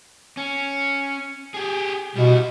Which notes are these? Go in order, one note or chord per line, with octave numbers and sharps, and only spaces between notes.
C#4
G4 G#4
B2 G3 E4